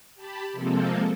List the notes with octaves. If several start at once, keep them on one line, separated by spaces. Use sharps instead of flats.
G4 A5 B5
C3 F3 G#3 A#3 C4 A4